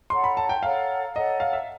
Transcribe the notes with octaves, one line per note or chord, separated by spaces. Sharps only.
A4 C#5 F#5 A#5 C6
B5
A5
G5
A4 C#5 F5 F#5 A#5
A4 C#5 D#5 F#5 A#5
F5
E5